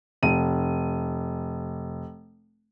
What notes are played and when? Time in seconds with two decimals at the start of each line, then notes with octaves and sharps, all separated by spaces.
0.22 F1 D#7